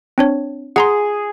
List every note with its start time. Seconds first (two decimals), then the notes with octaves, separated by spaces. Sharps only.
0.18 C4 D4 C#5
0.76 G#4 F#5 A#5 C6